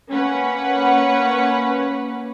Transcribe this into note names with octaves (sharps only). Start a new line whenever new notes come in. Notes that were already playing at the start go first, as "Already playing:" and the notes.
A#3 C#4 B4 F#5